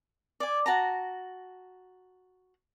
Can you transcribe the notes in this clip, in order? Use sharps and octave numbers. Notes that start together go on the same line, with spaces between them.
D5 G#5
F#4 A5 A#5